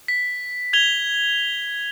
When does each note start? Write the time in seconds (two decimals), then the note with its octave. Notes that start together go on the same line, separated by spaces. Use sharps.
0.08 B6
0.73 G#6 F7 G7